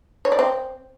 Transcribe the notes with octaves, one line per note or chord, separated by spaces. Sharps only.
C#5
D5
C4